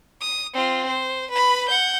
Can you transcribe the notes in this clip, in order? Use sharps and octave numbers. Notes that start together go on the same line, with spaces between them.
D#6
C4 F4
C5
B4 B5
F#5 G6